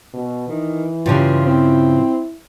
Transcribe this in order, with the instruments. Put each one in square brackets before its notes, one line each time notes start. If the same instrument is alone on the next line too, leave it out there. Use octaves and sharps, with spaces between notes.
[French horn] B2
[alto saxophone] D#3 [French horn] E3
[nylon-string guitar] G2 C#3 F3 [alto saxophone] F4
[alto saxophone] C4 [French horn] E4